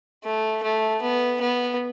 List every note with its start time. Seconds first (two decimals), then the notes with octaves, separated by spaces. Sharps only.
0.25 A3
0.63 A3
1.02 B3
1.41 B3